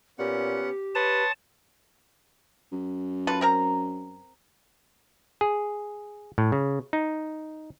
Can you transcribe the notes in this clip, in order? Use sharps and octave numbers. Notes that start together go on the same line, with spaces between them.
A#2 B3 C#4 G4 F#5
B4 C#5 A5 C6 D#6
F#2
F4 A4 B4
C4 A#4 A#5
G#4
A2
C#3
D#4